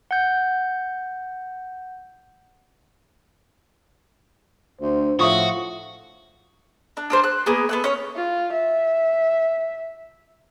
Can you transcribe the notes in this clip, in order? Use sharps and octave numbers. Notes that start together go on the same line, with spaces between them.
F#5 G6
D2 C5
A2 F3 F#4 E5 C#6 D#6
D4
D4 A#4 C5
F#6
A#3 B3 G#4
B3 A4 F#6
C#4 C#5
F4
E5